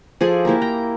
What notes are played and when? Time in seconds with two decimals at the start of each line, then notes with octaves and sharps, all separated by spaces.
0.21 F3 G#4 A4 D5
0.45 A#3 E4 G4 A#4
0.62 G5 A#5